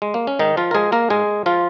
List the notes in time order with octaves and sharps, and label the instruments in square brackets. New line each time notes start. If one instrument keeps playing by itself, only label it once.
[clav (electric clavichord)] G#3
A#3
C#4
G#2 D#3 D#4
F3 F4
A#4
F3 G#3 G#4
A#3 A#4
G#2 G#3 G#4
F3 F4